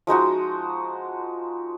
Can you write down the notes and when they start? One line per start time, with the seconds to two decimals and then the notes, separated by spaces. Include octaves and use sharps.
0.07 F3 G#3 D#4 F#4